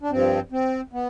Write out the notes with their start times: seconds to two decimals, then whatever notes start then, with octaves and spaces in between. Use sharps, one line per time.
0.02 D4
0.10 G2 F3 C4
0.52 C4
0.93 B3